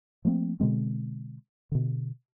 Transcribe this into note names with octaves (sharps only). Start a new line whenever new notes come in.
F3 A3 A#3 C4
B2 D3 G#3 C4
B2 D3